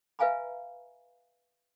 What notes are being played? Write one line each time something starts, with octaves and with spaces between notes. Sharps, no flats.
B4 E5 F5 G#5 A#5 B5